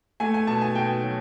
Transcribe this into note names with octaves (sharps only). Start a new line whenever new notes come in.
A3 G#5
G#5
B2 A5
G#5
B2 G5
F#3